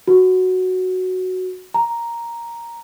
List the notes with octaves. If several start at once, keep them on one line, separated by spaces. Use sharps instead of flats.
F#4
A#5